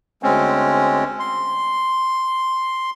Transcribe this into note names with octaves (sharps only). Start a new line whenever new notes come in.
D2 G#3 C4 C#4
C6